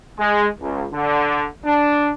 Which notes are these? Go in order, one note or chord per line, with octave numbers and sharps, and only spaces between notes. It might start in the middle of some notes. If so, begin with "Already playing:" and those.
G#3
C#2
D3
D4